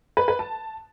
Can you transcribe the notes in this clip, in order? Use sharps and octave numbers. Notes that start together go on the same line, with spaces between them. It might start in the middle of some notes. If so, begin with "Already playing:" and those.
B4
B4
A5